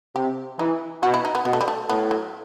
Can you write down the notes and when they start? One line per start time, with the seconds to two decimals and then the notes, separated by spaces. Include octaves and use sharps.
0.16 C3 G4
0.59 E3 D#4
1.02 B2 F#4
1.14 E4
1.25 D#4
1.35 B3
1.45 B2 B3
1.53 A3
1.61 G3
1.68 A3
1.89 A2 B3
2.11 F#3